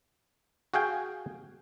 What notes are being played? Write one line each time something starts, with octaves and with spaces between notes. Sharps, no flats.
F#4 G#4 F5 G5 G#5